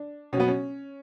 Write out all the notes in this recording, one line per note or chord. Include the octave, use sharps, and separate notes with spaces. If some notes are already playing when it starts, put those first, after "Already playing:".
Already playing: D4
B2 F#3 B3 C#4
C#4